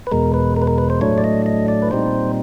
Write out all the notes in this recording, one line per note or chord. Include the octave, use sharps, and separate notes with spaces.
B4
E2 B2 G#3 A#4
B4
A#4
B4
A#4
B4
C5
A2 F#3 A3 D4 C#5
D5
D#5
D#5
D5
B4
A#2 G3 C4 D#4 C5